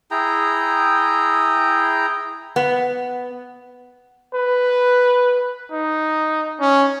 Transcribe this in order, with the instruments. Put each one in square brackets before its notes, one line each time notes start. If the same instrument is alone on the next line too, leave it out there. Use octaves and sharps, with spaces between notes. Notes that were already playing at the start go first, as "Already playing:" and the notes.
[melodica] E4 G#4 G5 A#5
[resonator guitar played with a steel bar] B3
[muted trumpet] B4
D#4
C#4